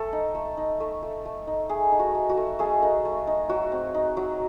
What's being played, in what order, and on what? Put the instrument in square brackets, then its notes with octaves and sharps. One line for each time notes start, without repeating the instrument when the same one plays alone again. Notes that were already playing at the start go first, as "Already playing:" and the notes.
Already playing: [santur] A3 A4
D#4
A3
D#4
A3
A3
A3
D#4
A3 G#4
D#4
F#4
A3
F#4
A3
A3 G#4
D#4
A3
D#4
F#3 F#4
C4
D#4
F#3